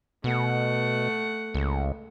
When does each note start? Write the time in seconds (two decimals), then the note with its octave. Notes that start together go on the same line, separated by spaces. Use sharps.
0.24 B2 A3 F#5
1.54 C#2